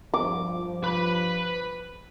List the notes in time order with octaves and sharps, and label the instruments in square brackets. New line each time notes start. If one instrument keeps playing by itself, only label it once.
[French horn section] G2 F3 [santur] D6
[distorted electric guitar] B4 B5